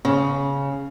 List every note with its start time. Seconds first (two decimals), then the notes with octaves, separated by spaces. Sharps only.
0.05 C#3